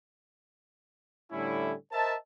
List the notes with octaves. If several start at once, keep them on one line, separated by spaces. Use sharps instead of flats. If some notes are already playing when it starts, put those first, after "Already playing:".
A2 D3 G3 C#4 E4
A#4 C5 D#5 E5 A5